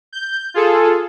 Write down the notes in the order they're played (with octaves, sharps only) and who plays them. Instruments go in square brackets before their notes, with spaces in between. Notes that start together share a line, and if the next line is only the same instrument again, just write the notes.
[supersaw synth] G6
F4 G#4 A4